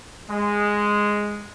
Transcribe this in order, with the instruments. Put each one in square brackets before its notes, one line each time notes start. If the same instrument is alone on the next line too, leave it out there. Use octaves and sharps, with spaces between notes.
[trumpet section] G#3